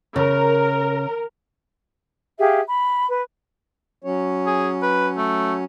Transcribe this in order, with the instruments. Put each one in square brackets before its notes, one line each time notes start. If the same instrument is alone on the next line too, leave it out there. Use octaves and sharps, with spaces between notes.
[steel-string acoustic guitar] C#3 [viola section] A#4
[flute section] G4 G#4 E5 F5
B5
B4
[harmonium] F#3 C#4 C#5
[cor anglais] G#4
B4
A3